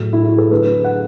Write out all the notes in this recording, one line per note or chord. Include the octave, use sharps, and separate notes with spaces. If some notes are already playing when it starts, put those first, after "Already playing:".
Already playing: A2 F#3 A3
E4
F#4
A4
D3 F#3 A3 B4
F#5